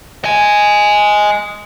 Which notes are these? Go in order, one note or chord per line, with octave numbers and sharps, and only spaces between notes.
D#5 G#5